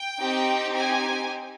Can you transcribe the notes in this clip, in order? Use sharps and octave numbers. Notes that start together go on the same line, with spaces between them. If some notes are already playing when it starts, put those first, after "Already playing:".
Already playing: G5
C4 D#4 G4
G#5